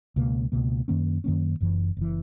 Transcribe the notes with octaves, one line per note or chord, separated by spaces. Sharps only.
C#2 B2 A#3
C#2 B2 A#3
F#2 D#3 A#3 C#4
F#2 D#3 A#3 C#4
F#1 F#2 E3
F#1 E3